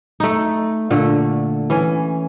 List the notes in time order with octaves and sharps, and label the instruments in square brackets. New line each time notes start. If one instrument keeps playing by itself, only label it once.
[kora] A3 D#4
A#2 D3 A3
E3 C#4